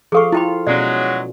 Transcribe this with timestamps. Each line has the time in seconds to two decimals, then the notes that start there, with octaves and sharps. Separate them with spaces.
0.12 F3 G#4 A4 F5 C#6
0.32 E4 F4 G5 B5
0.67 B2 F#3 G#3 C#4 D5